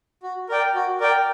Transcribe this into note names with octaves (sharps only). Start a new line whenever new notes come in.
F#4
A#4 D5 G5
F#4
A#4 D5 G5